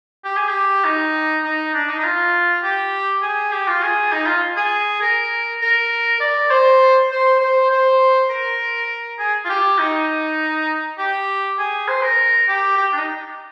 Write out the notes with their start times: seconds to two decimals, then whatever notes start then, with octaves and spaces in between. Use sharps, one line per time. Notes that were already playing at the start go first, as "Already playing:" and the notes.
0.24 G4
0.36 G#4
0.49 G4
0.84 D#4
1.43 D#4
1.73 D4
1.88 D#4
1.99 D#4
2.04 F4
2.63 G4
3.22 G#4
3.52 G4
3.67 F4
3.82 G#4
4.12 D#4
4.26 F4
4.57 G#4
5.01 A#4
5.62 A#4
6.20 D5
6.50 C5
7.10 C5
7.40 C5
7.70 C5
8.30 A#4
9.19 G#4
9.45 F4
9.49 G4
9.79 D#4
10.98 G4
11.59 G#4
11.88 C5
12.02 A#4
12.48 G4
12.77 G4
12.92 D4
12.97 D#4